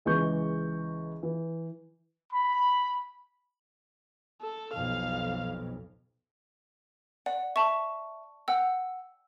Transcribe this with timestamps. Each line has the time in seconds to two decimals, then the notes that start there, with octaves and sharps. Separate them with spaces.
0.05 C#2 E3 G#3 C#6 G6
1.23 E3
2.33 B5
4.41 A4
4.74 B1 F2 F5
7.26 D5 F#5
7.56 E5 A5 C#6
8.48 F#5 G5 E6